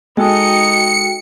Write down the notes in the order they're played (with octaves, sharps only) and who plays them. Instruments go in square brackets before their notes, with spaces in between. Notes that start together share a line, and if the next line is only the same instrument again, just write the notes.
[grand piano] G#3 A4 [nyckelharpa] D#4 D#5 [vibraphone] F#4 G5 [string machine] C#7